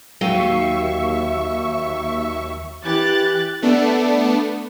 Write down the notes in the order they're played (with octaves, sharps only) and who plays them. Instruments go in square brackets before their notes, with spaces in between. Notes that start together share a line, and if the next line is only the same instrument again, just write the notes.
[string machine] D#2 E5 C#6 [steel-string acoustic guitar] F#3 F5 G5
[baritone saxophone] E3 [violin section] G4 F#6 A6
[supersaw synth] A3 B3 D4